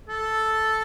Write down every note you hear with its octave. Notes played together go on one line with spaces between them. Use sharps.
A4